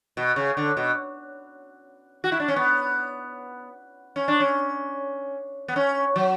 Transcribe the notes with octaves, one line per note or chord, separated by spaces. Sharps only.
B2
C#3
D3
B2
F#4
E4
D4
C#4
B3
C#4
D4
C#4
B3
C#4
F#3